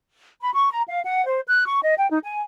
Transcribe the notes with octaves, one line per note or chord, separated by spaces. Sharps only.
B5
C#6
A#5
F5
F#5
C5
F#6
C#6
D#5
G5
D#4
G#5